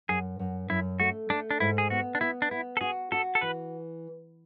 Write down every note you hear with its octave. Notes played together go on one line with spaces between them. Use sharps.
F#2 G#4
F#2
F#2 E4
A3 F#4
A3 D4
D4
G#2 E4
G#4
B3 F#4
D4
B3 E4
D4
B3 E4
A4
F#4 G#4
F#4 A4
A4
E3 B4